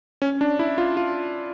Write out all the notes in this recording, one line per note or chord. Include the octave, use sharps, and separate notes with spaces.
C#4
D4
E4
F4
F4